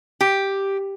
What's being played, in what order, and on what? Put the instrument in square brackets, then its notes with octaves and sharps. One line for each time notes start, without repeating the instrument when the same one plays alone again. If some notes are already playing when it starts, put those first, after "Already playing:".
[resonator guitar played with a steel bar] G4